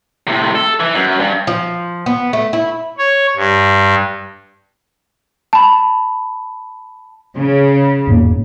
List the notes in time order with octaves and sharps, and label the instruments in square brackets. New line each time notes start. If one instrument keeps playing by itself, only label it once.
[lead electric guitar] A2 C3
A4
E3
F#2
G2
[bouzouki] F3
B3
A3
E4
[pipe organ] C#5
G2
[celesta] A5 B5
[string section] C#3
[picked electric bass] E1 G#2 A#3